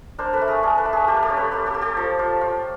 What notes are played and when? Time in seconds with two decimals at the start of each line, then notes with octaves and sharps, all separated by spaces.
0.18 D4 A#4 C5
0.33 A4 B4
0.41 A3
0.48 G#4 A#4
0.63 D4 G#4 A#4
0.78 A4 B4
0.85 A3
0.93 G#4 A#4
1.08 A#3 G4 A4
1.16 A#4
1.23 G4 A4
1.30 C#4
1.37 B4 C#5
1.52 A#3 A4 B4
1.66 G4 A4
1.74 A#3
1.81 G4 A4
1.97 F3
2.19 F4
2.41 F4